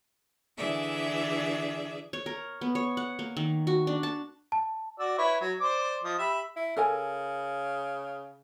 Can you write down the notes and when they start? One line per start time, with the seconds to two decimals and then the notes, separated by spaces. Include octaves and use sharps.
0.57 D3 E3 G#4 D5 E5
2.13 C#5
2.26 A#4
2.61 B3
2.75 C#5
2.97 F#5
3.19 A#3
3.37 D#3
3.67 F#4
3.87 D4
4.03 A5
4.52 A5
4.99 F#4 D5 E6
5.18 E4 B4 C#5
5.41 F#3 F#4
5.61 C5 D5 D6
6.04 F3 D#5
6.19 G4 E5 B5
6.56 E4
6.77 C#3 A4 A#4 G#5